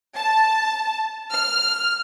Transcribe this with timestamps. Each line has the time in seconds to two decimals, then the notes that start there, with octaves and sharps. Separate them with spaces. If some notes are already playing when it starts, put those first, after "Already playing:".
0.16 A5
1.32 F6